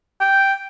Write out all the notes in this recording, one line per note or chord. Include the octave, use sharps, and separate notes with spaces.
G5